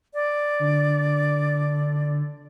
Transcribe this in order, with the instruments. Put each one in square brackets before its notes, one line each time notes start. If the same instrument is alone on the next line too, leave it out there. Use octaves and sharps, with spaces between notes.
[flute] D5
[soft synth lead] D3